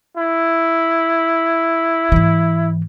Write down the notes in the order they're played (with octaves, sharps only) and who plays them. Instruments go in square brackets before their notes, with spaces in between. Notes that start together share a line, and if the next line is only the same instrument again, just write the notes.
[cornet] E4
[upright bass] G#2 E3